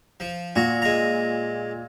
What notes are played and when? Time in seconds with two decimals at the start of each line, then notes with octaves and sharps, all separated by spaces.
0.20 F3
0.56 A#2 F#4 A#5
0.82 G#3 A#5